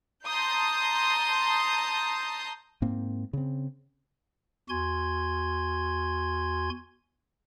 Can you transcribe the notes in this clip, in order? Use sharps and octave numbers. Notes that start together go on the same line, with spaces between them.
A5 A#5 C6 D#6 G6
G#2 A#3 C4
C#3 C4
E2 F#4 G#5 C6 G#6